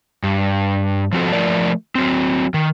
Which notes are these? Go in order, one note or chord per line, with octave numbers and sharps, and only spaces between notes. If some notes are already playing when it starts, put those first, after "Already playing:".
G2
F3 C4 F#4 A4
F3 A3 A#4 D5
F#3 C4
D#3